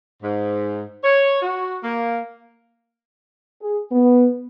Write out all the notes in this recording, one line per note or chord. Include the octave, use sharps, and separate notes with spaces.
G#2
C#5
F#4
A#3
G#4
B3